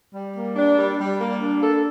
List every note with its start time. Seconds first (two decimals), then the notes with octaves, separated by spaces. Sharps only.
0.14 G3
0.35 A#3
0.56 D4
0.78 G3
0.99 G3
1.20 A#3
1.41 D4
1.62 A4